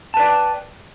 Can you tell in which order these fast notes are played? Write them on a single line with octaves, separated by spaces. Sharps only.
A5 B4 D5 G5